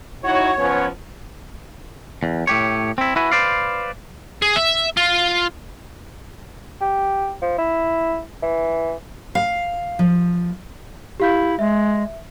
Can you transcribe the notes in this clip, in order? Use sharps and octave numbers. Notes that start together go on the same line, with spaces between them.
D#4 E4 F#4 C#5
F3 B3 C#4
E2
A2 G4 C#5
C4 E4
E4 F#4 B4 G#5
B4 C5 D5 F5
G#4
E5
F4
G4
F3
E4
E3
F5
F3
E4 G4 F5 G6
G#3 E5